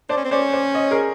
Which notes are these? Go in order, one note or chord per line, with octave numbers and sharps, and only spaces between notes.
D4 C5 D5
C#4
C4
C#4 C5 D5
C5 D5
C#5 D#5
G#4 A#4